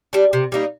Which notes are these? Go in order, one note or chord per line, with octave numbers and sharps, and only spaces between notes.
G3 D4
C3
G3 A#3 D#4